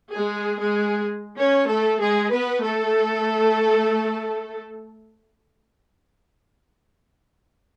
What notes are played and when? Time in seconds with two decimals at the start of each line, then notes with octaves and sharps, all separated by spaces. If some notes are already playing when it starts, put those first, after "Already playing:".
0.13 G#3 G#4
0.61 G#3 G#4
1.39 C#4 C#5
1.70 A3 A4
2.01 G#3 G#4
2.32 B3 B4
2.63 A3 A4